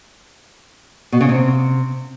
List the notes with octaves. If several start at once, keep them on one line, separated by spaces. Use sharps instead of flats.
B2
C#3
C3